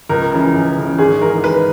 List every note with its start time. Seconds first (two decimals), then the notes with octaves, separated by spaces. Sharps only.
0.09 C#2 A#4
0.31 C#3 E3
0.54 C#2
0.76 C#3 E3
0.99 G#1 G#4
1.21 G#2 E3 A#4
1.43 G#1 B4